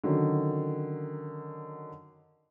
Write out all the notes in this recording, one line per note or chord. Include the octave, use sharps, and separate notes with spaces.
D3 D#3 F#3 C#4